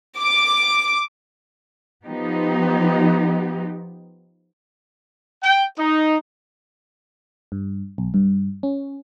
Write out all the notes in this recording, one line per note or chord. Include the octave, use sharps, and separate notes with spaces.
D6
F3 B3 D#4 G4
G5
D#4
G2
B1
G2
C#4